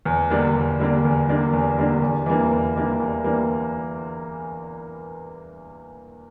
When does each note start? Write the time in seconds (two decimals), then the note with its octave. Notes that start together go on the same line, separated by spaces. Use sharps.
0.05 E2
0.30 D3 G3 A#3 D4
0.55 E2
0.80 D3 G3 A#3 D4
1.05 E2
1.29 D3 G3 A#3 D4
1.53 E2
1.78 D3 G3 A#3 D4
2.02 E2
2.26 E3 G3 A#3 D4
2.51 E2
2.76 E3 G3 A#3 D4
3.00 E2
3.24 E3 G3 A#3 D4